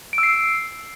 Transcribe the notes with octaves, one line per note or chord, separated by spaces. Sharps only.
D7
E6
C7